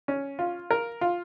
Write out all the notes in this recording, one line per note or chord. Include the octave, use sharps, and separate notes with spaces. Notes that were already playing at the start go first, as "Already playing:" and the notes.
C#4
F4
A#4
F4